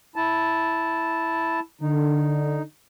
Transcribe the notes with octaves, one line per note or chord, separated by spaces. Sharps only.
E4 A5
D3 D#4